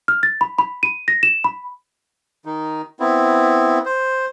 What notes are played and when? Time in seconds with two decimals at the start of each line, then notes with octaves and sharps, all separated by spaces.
0.08 F6
0.23 A6
0.41 B5
0.58 B5
0.83 D#7
1.08 A#6
1.23 E7
1.44 B5
2.45 D#3 D#4
3.00 B3 C4 E4
3.85 C5